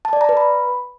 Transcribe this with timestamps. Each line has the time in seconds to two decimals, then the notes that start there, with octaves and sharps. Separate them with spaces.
0.05 A5
0.13 D5
0.21 A#5
0.29 B4
0.37 B5